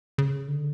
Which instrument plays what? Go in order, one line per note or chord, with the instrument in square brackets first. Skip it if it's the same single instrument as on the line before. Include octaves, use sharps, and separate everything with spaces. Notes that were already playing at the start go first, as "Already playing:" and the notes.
[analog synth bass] C#3
D3